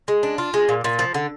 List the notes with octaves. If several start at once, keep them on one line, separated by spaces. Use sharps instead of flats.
G#3
D4
F4
G#3
A#2
A#2
F3
D3